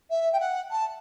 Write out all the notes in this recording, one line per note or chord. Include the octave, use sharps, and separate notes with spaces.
E5
G5
F#5
A5